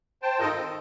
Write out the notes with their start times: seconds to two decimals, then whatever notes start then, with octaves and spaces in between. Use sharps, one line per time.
0.22 C5 G5 A5
0.40 D#3 D#4 F4 A4 A#4 D#5
0.53 C4
0.67 D#3